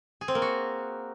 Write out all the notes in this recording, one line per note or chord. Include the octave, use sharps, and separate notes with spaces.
G#4
C4
A#3
F#4